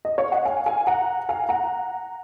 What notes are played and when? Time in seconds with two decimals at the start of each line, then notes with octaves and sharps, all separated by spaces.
0.05 D#5
0.18 C#5 F5
0.32 D#5 F#5
0.45 F5 G#5
0.66 F5 G#5
0.87 F#5 A#5
1.29 F5 G#5
1.49 F#5 A#5